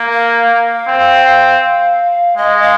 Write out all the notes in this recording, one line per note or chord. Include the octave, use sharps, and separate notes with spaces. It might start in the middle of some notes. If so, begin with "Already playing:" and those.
Already playing: A#3
F5
C4
G#3 D#5
F5